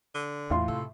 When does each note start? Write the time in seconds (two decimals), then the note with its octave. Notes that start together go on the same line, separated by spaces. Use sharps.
0.15 D3
0.50 E2 A2 F4 C6
0.68 C3 A4